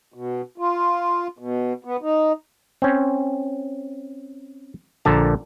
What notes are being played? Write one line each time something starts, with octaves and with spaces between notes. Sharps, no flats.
B2
F4
B2
B3
D#4
C4 C#4
A#1 A#2 D3 A5 A#5